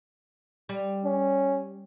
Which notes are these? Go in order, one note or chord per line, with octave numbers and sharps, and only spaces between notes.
G3
C#4